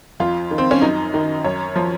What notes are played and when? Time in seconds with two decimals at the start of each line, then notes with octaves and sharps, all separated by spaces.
0.20 F2 F4
0.51 D#3
0.58 C4
0.71 C#4
0.82 F#2 D#4
1.14 D#3
1.44 F#2 C#5
1.76 F3